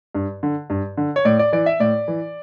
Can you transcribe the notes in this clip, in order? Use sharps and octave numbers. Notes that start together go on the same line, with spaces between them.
G2
D3
G2
D3
C#5
A2 D5
D5
E3 D5
E5
A2 D5
E3